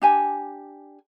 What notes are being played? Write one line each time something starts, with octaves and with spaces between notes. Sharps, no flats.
D4 G4 G#5